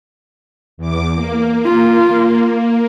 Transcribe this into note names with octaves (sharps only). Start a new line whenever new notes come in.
E2 D6
A#3
F4